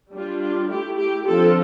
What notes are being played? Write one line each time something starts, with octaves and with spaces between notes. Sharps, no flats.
G3 D4 F4
F4
A3 E4 G4
G4
D3 F3 C4 F4 A4